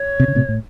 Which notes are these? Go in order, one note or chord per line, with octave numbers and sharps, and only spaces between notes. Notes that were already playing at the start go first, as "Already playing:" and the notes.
Already playing: C#5
C3
C#3
A2 C3
A2